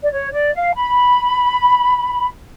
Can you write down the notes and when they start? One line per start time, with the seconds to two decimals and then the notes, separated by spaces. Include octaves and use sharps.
0.03 D5
0.12 C#5
0.32 D5
0.54 F5
0.75 B5